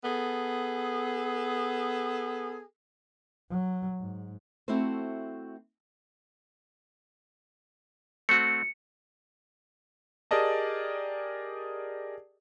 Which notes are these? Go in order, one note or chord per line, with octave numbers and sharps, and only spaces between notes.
B3 G#4 A4
F#3
G#2
A3 C4 E4 F#4 A4 C5
A3 C4 F#4 C#7
G4 G#4 A#4 D5 D#5 A5